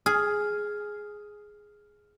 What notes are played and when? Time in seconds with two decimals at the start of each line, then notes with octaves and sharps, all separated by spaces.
0.06 G#4 F6